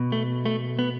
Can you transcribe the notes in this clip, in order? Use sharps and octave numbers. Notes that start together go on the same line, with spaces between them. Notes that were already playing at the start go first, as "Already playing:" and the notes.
Already playing: B2
A3
A3
B3